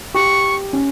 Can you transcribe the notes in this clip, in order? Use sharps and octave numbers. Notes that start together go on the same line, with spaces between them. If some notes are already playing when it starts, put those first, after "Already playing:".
G4 C#6
C#4